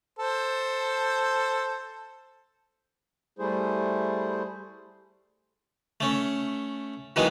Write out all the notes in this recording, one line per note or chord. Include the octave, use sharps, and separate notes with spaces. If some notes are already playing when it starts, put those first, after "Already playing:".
A4 C5
G3 A3 E4 G#4 C5
A3 C#4
D#3 E3 F#3 G#3 A#3 B3